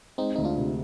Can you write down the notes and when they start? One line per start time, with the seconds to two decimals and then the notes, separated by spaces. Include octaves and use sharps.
0.18 G#3 C4 D#4
0.36 D2 D#4
0.44 D4 F4
0.57 C3